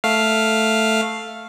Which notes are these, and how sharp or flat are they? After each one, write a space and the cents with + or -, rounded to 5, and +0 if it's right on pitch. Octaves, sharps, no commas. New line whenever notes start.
A3 +0 F5 +0